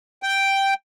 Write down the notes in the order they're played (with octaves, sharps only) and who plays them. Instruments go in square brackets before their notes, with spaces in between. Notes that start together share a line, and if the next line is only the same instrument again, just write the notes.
[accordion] G5